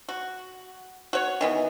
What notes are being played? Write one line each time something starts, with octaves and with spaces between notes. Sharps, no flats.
F#4
F#4 C#5
D#3 E3 B3